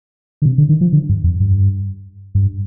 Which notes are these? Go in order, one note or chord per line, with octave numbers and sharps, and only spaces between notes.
D3
C3
D3
D#3
F3
D3
G2
F2
G2
G2